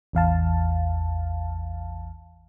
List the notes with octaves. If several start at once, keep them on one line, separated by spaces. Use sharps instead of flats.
A1 E2 F5 A5